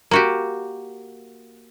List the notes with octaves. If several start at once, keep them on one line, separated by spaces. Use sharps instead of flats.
A#3 F#4 G4